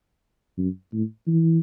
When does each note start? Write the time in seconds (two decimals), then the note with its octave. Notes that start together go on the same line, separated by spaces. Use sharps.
0.58 F#2
0.93 A2
1.27 E3